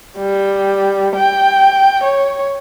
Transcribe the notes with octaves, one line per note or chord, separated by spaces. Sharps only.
G3
G5
C#5